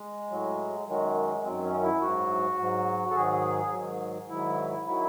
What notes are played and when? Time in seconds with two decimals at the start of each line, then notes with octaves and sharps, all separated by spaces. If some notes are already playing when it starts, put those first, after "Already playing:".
Already playing: G#3
0.30 A2 F#3
0.88 F#2 D#3 F#3 G#3
1.45 F#2 D#3 F#3 C4
1.64 C#4
1.83 E4
2.02 G#2 F#3 F#4
2.59 G#2 F#3
3.10 A4
3.15 G#2 D#3 F#3 G#4
3.72 G#2 D#3 F#3
4.29 G#2 D#3 F#3 E4
4.86 D#3 F#3 E4